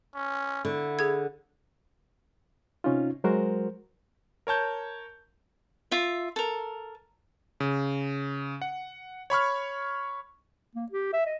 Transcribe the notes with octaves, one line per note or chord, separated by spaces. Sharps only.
C#4
D3 E4
G#4 G#6
C3 C#4 D#4 F4
F#3 G#3 F#4 A#4 C5
A#4 C#5 A5 G6
F4 E5
A4 A#4
C#3
F#5
C#5 B5 C#6 F6
A#3
G4
E5
D#5